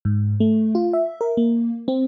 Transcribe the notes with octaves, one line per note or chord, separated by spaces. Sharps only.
G#2
A3
F4
E5
A#4
A#3
C4